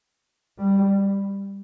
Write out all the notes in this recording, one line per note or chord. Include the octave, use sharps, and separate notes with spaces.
G3